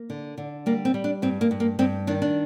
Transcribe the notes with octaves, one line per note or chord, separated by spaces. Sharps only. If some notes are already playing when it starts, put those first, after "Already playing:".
Already playing: A#3
D3
D3
G3 A#3
C4
G3
D4
G2 C4
A#3
G2
A#3
G2 C4
D#3 D4
D4